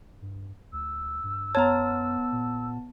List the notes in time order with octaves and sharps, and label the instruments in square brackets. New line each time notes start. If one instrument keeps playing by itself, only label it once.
[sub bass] G2
[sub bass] D2 [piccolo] E6
[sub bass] G2
[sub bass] F#2 [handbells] B3 A5 [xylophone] C#5 A#5
[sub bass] A#2